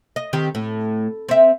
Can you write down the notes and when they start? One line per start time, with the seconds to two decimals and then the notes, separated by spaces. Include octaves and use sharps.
0.16 D#5
0.33 D#3 C4 G4
0.55 A2
1.29 C4 E5